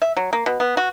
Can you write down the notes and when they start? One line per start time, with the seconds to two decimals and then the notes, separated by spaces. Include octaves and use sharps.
0.02 E5
0.17 F#3
0.33 A#3
0.46 B2
0.60 B3
0.77 F#4